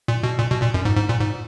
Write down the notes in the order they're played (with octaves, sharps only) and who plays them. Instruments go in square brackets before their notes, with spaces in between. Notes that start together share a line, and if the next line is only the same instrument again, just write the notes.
[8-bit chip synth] A#2
B2
A#2
B2
A#2
F#2
G#2
G#2
A#2
G#2